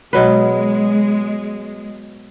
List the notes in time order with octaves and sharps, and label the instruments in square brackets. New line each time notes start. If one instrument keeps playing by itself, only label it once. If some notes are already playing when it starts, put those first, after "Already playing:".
[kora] B2 F#3 B4 [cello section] G#3